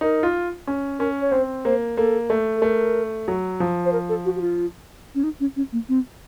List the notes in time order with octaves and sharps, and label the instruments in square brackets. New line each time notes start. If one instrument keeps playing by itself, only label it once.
[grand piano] D#4 [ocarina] A#4
[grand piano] F4
C#4
[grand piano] C#4 [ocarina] A#4
[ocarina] C#5
[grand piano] C4 [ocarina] C5
[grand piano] A#3 [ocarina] C5
[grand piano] A#3 [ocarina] A4
[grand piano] A3
[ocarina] A4
[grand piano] A3 [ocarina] A#4
[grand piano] F#3
F3
[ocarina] C5
A#4
A4
F#4
F#4
F4
C#4
D#4
C#4
C#4
A#3
C4